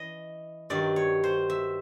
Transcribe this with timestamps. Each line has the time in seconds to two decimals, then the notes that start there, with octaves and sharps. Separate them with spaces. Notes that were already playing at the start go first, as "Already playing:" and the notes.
Already playing: E3 D#5
0.70 G2 D#3 F#3 D5
0.96 C#5
1.24 C5
1.50 E5